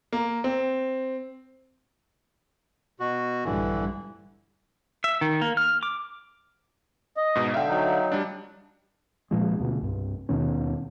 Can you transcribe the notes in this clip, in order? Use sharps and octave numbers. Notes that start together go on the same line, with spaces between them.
A#3
C4
B2 F#4
A#1 G2 D3 E3
E5
D#3
A#3
F6
D6
D#5
G#2 B2 D#4
D3 E5 F5 G5
F#3 D#4
G3 D4
A#2 F3 G#3
D2 B2
C2 G2
D#2 B2 D#3 C#4